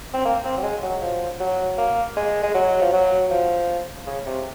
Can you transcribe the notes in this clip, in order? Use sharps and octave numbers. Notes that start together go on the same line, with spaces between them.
C4
A#3
C4
F#3
G#3
F#3
F3
F#3
A#3
G#3
G#3
F#3
F3
F#3
F3
C#3
C3